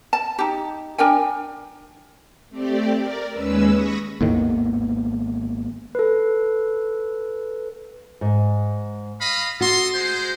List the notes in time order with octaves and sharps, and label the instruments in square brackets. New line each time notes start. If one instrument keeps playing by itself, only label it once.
[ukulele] A5
D#4 G4
D4 A#4 G5 G#5
[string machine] A3 C4 G4 D5
A#4 D5
D#2 G#3 C#4 B4 E6
B5 C#6 D#6 A#6
[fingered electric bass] G#1 A#3 B3 [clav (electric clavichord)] D#2 A2 D#3
[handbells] A4 B4
[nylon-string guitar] G#2
[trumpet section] D#5 F5 B5
[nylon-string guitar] F#4 [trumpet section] A4 D#5 C6
[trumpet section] G#3 C5